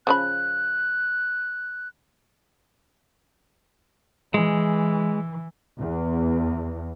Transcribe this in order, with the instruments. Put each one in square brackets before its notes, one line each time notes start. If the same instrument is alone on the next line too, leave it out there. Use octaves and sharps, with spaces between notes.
[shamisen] C#3 F3 B5 [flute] F#6
[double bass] E3 [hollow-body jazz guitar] G#3
[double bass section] E2